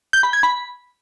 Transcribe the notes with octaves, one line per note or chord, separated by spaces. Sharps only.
G6
B5
G#6
B5